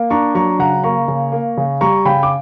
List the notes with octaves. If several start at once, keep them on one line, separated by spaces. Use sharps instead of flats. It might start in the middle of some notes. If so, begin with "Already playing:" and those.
Already playing: A#3
D4 A#5 C#6
F#3 A#5 C#6
C#3 F#5 A#5
A#3 A#5 C#6
C#3
A#3
C#3
G3 A#5 C#6
C#3 G5 B5
D6